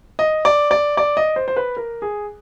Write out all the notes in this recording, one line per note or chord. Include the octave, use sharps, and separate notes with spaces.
D#5
D5
D5
D5
D#5
C5
C5
B4
A#4
G#4